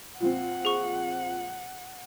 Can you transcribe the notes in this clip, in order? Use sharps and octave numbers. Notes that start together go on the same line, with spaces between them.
A#2 F3 C4 F#5
G#4 C#6